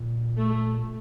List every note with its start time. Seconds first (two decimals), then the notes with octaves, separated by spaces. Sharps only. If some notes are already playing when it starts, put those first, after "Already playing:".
Already playing: A#2
0.38 A3